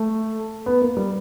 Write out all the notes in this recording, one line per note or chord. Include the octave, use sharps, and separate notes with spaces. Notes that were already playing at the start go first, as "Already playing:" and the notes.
Already playing: A3
B3
A#3
G3